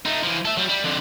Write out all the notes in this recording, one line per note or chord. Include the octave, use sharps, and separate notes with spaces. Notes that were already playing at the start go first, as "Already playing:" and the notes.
A3 D#4
E3 F3
A4 E5
F#3 G3
G3
F2 D3